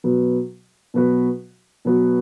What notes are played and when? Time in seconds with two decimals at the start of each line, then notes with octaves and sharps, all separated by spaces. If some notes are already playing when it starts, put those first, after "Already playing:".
0.04 B2 F#3 B3 F#4 B4
0.94 B2 F#3 B3 F#4 B4
1.85 B2 F#3 B3 F#4 B4